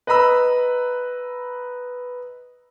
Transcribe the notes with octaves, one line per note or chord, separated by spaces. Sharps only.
B4 D#5 A#5 B5 E6